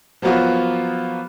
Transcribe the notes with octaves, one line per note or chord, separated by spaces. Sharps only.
F3 F#3 A#3 B3 F4 F#4